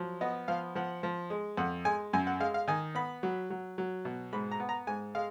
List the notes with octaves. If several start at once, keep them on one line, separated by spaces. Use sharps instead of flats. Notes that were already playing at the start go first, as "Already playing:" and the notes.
Already playing: F3 F#3
B3 D#5
F3 F5
F3 F#5
F3
G#3
F2 F#5
G#3 G#5
F#2 G#5
F#5
G#3 F5
F5
D#3 G#5
B3 B5
F#3
F#3
F#3
B2
G#2 B5
A#5
B3
A#5
G#2 G#5
G#3 F5